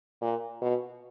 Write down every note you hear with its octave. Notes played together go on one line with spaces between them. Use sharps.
A#2
B2